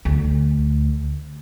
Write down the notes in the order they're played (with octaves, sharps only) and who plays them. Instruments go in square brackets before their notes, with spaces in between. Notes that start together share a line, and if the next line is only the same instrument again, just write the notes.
[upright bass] D2